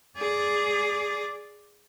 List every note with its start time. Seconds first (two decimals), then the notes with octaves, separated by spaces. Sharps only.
0.18 G#4 D5